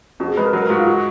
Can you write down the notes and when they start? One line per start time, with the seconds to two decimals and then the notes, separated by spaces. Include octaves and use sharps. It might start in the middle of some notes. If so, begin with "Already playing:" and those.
0.20 F2 F#4
0.28 G#4
0.37 G#3 B4
0.45 A#4
0.53 F#3 B4
0.62 A#4
0.70 G#2 F#4
0.78 F4
0.87 F#4